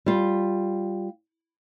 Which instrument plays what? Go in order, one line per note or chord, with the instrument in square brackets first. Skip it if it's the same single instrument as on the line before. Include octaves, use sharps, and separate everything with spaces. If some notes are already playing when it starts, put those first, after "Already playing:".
[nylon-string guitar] G3 F4